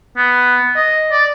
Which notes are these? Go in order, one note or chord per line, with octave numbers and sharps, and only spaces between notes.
B3
D#5
D5